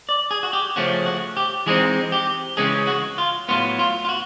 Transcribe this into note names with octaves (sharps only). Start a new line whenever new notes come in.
D5
G#4
F#4
G4
C#3 F3 A3 C#4 F#4
F#4
G4
E3 G#3 C4 D#4 G#4
G4
C#3 E3 G#3 C#4 G#4
F#4
F4
A2 F#3 B3 F4
F4
F4
F#4